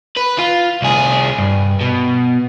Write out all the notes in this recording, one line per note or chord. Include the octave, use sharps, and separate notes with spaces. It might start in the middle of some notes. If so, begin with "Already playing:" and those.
B4
F4
C2 G#4
G2
B2